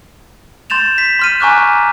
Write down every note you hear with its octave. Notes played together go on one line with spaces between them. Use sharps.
C6 G6 A6 E7 F7
B6
C6 F6 D#7
G#5 A#5 C#6 D6 F6 F#6